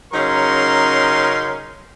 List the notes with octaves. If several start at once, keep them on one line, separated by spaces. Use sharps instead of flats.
C#3 F#3 C#4 D#4 A#4 C6